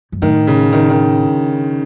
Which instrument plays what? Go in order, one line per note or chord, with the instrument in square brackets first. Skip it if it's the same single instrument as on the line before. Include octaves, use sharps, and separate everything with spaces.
[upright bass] F#2
[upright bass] A2 [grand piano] D#3
[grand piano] C#3
D#3
D#3